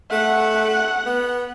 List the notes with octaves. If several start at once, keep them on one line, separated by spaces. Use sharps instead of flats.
A3 F#5
B3